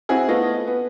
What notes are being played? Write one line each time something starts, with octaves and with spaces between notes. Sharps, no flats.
C4 E4 F#4 G#4
A3 B3 F4 D#5
B3